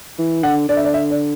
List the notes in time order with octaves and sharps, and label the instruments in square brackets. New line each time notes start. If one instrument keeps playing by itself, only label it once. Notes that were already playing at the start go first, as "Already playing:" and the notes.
[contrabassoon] E3
[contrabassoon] D3 [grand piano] F#5
[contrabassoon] D3 [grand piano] D5
[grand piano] E5
D5
E5
D5